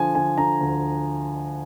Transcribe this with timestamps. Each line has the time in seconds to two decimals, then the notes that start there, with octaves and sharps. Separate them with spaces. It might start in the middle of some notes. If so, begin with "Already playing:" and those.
Already playing: D3 F3 G#5
0.15 D3 G#5
0.38 D3 A#5
0.61 D2